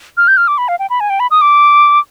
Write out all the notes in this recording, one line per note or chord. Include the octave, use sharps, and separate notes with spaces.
F6
G6
F6
D6
B5
F5
G5
B5
G#5
G5
B5
D#6
D6